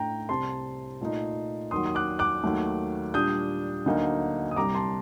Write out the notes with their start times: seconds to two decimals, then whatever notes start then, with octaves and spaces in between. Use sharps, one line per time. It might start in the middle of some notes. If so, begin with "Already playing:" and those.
Already playing: A2 A3 D4 G5 A#5
0.29 C2 C3 G3 C4 A5 C6
1.01 A#2 A3 D#4
1.71 D#2 D#3 F#3 C6 D#6
1.86 D#6
1.95 D6 F#6
2.19 D6 F#6
2.44 D#2 D#3 F#3 A3
3.14 A#2 G3 D4 D#6 G6
3.86 D2 D3 F#3 A#3 D#4
4.51 D#6
4.56 C2 C3 G3 A#5 D6
4.75 A5 C6